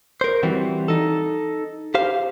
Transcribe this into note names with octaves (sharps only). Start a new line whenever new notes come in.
A#4 C5
E3 G3 C4 F#4
D#4 A4
G4 C5 F5